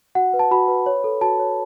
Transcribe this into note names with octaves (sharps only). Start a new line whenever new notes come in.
F#4 F#5
B4
A5
F#4 B5
B4
C#5
A4
F#4 A5
C#5